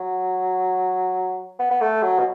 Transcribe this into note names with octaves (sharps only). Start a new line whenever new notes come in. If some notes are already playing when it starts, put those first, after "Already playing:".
Already playing: F#3
B3
B3
A3
F#3
B2